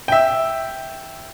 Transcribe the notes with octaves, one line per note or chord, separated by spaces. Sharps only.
E5 G5